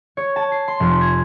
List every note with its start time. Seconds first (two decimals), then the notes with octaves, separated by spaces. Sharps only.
0.17 C#5
0.36 A5
0.52 C7
0.68 C6
0.80 F1
1.01 G#6